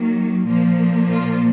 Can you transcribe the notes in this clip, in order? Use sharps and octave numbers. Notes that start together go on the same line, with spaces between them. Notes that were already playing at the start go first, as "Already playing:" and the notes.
Already playing: D#3 F#3 A#3
A#2 F3 A#3
F4